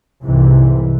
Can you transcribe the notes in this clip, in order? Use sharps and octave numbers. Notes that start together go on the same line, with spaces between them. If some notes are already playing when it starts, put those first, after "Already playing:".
C2 G#2 C3 E3